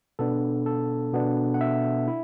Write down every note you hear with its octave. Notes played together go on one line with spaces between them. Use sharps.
B2 B3 D4 A4
A4
B2 B3 D4
F#5
E5
E4